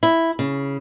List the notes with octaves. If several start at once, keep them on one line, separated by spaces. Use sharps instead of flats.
E4
C#3